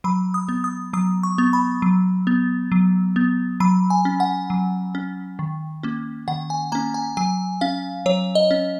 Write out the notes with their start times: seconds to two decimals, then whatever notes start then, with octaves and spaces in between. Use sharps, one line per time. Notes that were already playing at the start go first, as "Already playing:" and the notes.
0.04 F#3 B5
0.34 D#6
0.49 B3
0.64 D#6
0.93 F#3 D#6
1.23 C#6
1.38 B3
1.53 B5
1.82 F#3
2.27 B3
2.72 F#3
3.16 B3
3.60 F#3 B5
3.90 G#5
4.05 C#4
4.20 F#5
4.50 F#3
4.95 C#4
5.39 D#3
5.83 A#3 C#4
6.28 D#3 F#5
6.50 G#5
6.72 A#3 C#4 A#5
6.94 G#5
7.17 F#3 G#5
7.61 C#4 F5
8.06 F#3 C#5
8.35 D#5
8.51 C#4